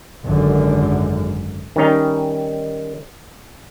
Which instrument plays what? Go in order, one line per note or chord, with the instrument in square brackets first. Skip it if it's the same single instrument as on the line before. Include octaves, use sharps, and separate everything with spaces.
[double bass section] G#1 F#2 D3
[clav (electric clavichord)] D#3 G3 C#4 D#4